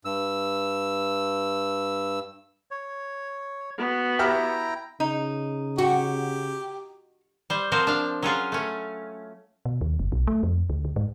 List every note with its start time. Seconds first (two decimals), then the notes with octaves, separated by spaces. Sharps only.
0.05 G2 E6
2.71 C#5
3.78 B3 F#4
4.19 E4 G4 E5 G5 A#5 F6
5.00 C#3 D#4
5.78 F#4 G4
7.50 G3 C5
7.72 F3 C4 F#4 A#4 C5 F5
7.87 D4 F5
8.23 F#3 C#4 F4 G#4
8.52 A3 C#4
9.65 B2
9.81 D#2
9.99 F#1
10.12 B1
10.27 A3
10.43 F2
10.70 D2
10.85 D2
10.96 G#2